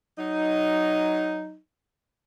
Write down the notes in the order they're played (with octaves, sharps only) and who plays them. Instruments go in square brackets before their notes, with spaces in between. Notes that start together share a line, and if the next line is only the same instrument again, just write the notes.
[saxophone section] F#3 D#4